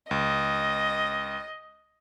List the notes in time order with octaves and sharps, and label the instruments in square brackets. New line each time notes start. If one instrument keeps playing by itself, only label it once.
[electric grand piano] C#2 [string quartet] D#5